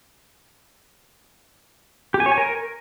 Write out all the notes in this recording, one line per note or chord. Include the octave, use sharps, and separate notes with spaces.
G4
G#5
C#5
G#5
A#4